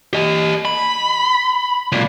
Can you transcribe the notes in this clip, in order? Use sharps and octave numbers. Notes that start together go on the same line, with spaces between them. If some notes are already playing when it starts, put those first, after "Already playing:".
G4 D#5
B5
C#2 A#2